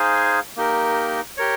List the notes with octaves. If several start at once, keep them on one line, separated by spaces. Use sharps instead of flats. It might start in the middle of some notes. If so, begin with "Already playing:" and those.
Already playing: D#4 G#4 C5 F5 G#5
A#3 D#4 G4 A#4
G4 A#4 C#5